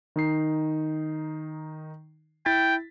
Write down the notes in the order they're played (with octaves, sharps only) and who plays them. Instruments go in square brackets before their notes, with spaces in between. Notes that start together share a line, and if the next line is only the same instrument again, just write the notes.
[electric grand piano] D#3 D#4 C7
[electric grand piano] E4 A6 B6 [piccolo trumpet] G5